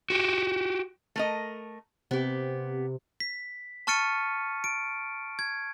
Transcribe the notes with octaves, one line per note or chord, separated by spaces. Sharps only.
F#4 G4
A3 A#4 D#5
C3 B3 G4
B6
A5 C#6 F6 A6 C#7 D#7
D7
G#6